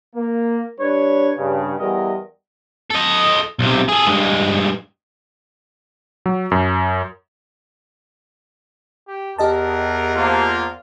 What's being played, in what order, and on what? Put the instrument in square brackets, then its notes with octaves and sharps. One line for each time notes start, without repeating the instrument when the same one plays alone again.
[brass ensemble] A#3
G3 D4 B4 C#5
G2 C#3
E2 G3 A#4 D#5
[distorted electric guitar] A4 D#5
B1 C3
G#4 A4
G2 G#3
[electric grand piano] F#3
F#2
[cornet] G4
[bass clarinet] E2 [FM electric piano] G4 D#5 A5 [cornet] A#4
[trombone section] F3 A#3 [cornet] F4